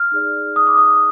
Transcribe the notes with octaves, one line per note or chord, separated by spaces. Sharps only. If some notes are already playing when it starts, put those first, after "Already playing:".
Already playing: F6
D#4 G#4 D5
D#6
D6
D#6